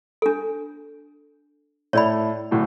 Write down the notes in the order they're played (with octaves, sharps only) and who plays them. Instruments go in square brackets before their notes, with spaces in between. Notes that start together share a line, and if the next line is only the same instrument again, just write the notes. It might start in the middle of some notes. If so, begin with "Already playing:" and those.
[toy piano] D4 A4
[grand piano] A2 A3 [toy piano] C#5 D5 B5
[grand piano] D1 A2